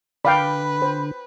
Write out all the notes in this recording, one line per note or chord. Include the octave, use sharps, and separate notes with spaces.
D3 B4 D5 F5 G5 B5
C5